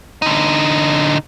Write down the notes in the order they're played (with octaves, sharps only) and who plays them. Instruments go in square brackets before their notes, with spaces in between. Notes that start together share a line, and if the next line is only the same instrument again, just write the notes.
[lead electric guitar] D3 D#4